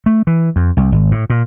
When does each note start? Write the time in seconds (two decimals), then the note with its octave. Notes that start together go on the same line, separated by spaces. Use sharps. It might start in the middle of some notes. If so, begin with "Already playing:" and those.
0.06 A3
0.27 E3
0.56 F2
0.77 C2
0.92 G#1
1.11 A2
1.30 A#2